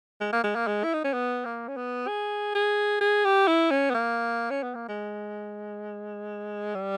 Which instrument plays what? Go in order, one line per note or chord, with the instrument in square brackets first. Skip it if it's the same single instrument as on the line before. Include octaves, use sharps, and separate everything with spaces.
[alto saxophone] G#3
A#3
G#3
A#3
G#3
E4
D#4
C#4
B3
A#3
C#4
B3
G#4
G#4
G#4
G4
E4
C#4
B3
A#3
C#4
B3
A#3
G#3
G3